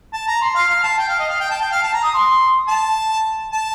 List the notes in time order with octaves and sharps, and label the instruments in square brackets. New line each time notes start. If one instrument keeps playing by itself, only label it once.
[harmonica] A5
A#5
C6
F5
F5
A5
G5
F5
D#5
F5
G5
A5
G5
F5
A5
A#5
D#6
C6
A5
A5